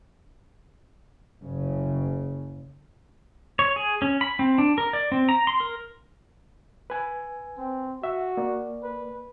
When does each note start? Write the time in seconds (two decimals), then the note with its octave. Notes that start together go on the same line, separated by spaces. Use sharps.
1.42 F#1 C#3
3.59 C#5
3.76 G#4
4.02 C#4
4.21 B5
4.39 C4
4.58 D4
4.78 A#4
4.93 D5
5.12 C4
5.29 A#5
5.47 C6
5.60 A#4
6.90 B4 G#5
7.58 C4
8.03 F#4 E5
8.37 A#3 D5
8.83 B4